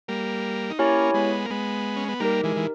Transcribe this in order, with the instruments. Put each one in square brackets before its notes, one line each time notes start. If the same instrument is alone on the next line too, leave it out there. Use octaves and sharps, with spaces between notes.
[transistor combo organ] G3 A#3
D#4
[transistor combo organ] A#3 C#4 [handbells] E4 G4 C#5 G#5
[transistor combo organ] G#3 B3
A#3
G#3 B3
C#4
B3
[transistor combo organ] G3 A#3 [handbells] D#4 G4 A#4
[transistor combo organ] E3 G#3
E3